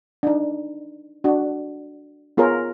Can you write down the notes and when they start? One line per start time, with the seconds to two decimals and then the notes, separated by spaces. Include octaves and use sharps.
0.23 D4 D#4
1.24 D4 F#4
2.37 B3 F4 G#4 A#4 C#5